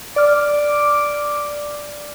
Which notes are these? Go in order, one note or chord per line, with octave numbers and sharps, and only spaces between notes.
D5 D6 F6